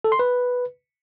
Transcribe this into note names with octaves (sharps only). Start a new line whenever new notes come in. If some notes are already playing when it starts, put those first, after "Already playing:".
A4
C6
B4